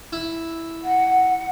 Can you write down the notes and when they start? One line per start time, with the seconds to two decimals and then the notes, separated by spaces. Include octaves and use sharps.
0.12 E4
0.84 F#5